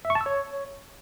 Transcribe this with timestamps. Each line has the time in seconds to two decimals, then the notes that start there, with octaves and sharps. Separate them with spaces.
0.05 E5
0.10 C#6
0.15 A5
0.21 E6
0.26 C#5